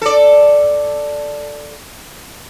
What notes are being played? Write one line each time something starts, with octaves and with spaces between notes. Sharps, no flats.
A4 D5